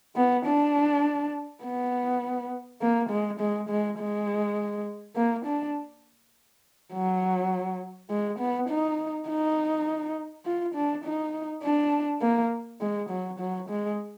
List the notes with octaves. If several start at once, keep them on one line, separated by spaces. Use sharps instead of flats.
B3
D4
B3
A#3
G#3
G#3
G#3
G#3
A#3
D4
F#3
G#3
B3
D#4
D#4
F4
D4
D#4
D4
A#3
G#3
F#3
F#3
G#3